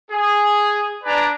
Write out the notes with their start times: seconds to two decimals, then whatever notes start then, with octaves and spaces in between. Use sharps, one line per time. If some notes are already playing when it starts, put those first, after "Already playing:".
0.11 G#4
1.04 D4 B4 D5 G#5 A#5